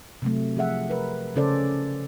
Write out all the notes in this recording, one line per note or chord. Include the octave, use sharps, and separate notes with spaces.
C3 F#3 A3
F3 G#4 E5 F#5
A#4 B4
C#3 C#4 A4 C5 D5